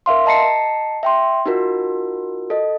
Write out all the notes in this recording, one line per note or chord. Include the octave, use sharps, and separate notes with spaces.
A#4 E5 F5 C6
D#5 A5 A#5 C7 C#7
E5 G5 C6
D#4 F4 F#4 A#4
A4 D#5